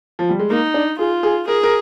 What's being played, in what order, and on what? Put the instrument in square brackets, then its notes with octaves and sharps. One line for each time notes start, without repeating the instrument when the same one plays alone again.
[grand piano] F3
G3
G#3
[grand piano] A#3 [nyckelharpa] D#4
[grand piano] D4
[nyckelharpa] F4 [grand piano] G#4
[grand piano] G#4
[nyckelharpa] G#4 [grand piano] A#4
[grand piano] A#4